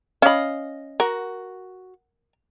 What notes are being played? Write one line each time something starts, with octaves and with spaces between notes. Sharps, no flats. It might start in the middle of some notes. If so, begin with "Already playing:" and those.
C#4 D#5 F5 B5
F#4 A#4